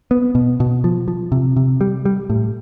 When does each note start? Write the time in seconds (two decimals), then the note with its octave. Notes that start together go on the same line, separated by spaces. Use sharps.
0.11 B3
0.35 B2
0.60 B2
0.84 F3
1.08 F3
1.32 C3
1.56 C3
1.81 G3
2.05 G3
2.30 A2